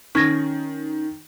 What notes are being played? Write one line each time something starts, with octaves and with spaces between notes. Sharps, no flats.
D#3 C#4 C#6 G#6 A#6